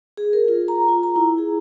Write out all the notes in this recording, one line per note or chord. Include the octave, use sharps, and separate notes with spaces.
G#4
A#4
F4
A#5
F4
A#5
E4
G#4